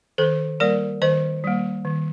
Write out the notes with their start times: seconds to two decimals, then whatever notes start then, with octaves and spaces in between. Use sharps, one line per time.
0.18 D#3 A4 C5
0.60 G3 A#3 A#4 D5
1.02 D#3 C5 D#5
1.44 G3 A#3
1.85 D#3